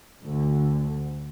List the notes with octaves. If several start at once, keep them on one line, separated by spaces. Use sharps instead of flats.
D2 D3